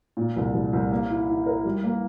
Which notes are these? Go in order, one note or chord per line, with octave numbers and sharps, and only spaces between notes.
A#2
C2
C2
C2
A#3
E4
E4
A#4
G3
A#3